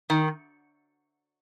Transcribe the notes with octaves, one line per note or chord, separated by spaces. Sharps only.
D#3